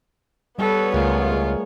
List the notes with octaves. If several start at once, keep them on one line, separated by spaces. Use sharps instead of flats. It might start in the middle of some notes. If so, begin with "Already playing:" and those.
G3 B3 A4 B4 C#5
C#2 A3 F4 G#4 A#4
G#4